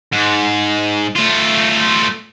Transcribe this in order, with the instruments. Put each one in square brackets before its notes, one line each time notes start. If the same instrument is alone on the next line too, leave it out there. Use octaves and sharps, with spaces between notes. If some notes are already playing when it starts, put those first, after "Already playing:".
[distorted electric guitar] G#2
A3 F4